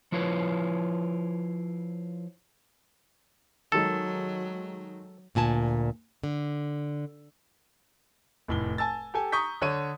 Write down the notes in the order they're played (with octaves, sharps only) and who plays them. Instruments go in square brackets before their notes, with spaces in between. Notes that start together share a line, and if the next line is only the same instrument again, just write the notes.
[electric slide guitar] F3 E4 F4 B4 C#5
[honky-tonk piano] D#3 G#3 D#4 [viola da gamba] F#3 [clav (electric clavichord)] A4
[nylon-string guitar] D2 A#2 G#5 A5
D3
[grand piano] F1 A2 G7
G#5 A5 E6 A6
G4 A4 G#5
A#5 C#6 D#6 G6 B6
D3 C#5 D#7